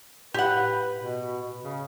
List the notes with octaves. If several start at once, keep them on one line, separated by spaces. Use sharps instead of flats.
A2 G4 B4 F#5
B2
C#3